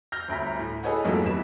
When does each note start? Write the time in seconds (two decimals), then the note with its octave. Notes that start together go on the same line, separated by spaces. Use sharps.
0.12 F6 G6 A#6
0.28 G1 D2 A#5 B6
0.59 A2
0.83 G#4 A4 B4 C#5 D#5 F#5
1.04 F2 G#2 E3 F#3 A3 A#3
1.25 D#1 B3 B6 E7